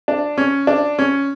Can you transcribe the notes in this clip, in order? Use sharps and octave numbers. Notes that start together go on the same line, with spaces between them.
D4
C#4
D4
C#4